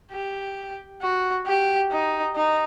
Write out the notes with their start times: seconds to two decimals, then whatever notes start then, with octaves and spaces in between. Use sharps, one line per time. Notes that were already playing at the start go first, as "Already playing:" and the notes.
0.11 G4
1.02 F#4
1.47 G4
1.91 D#4
2.36 D#4